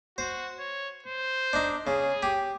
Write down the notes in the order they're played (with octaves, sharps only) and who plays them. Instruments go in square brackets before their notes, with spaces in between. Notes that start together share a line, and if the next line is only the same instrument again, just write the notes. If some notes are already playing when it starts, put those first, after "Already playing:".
[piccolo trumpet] F#4 [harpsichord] C5
[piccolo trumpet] C#5
C5
[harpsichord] D4 D#4
[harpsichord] C#3 [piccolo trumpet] G#4
[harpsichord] G4